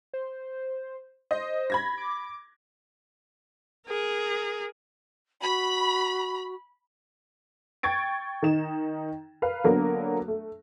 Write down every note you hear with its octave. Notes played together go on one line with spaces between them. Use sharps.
C5
C5 D#5
B5 G#6 A#6
D6
G#4 A#4
F#4 B5
G5 C#6 G#6 A6 D7
D#3 D#4 E7
A#4 B4 F5
D3 F#3 A#3 B3 D4 A#4
A3